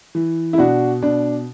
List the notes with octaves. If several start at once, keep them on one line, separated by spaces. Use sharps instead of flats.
E3
E4
B2 D4 F#4
B2 D4